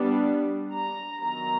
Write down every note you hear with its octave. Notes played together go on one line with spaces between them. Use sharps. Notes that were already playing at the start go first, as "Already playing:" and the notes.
Already playing: G3 B3 D4
A#5
D#3 F#3 B3 A#5